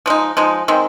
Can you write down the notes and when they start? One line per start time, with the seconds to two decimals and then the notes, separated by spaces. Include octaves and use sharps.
0.06 F3 G#3 D#4
0.37 F3 G#3 D#4
0.68 D#3 G#3 C4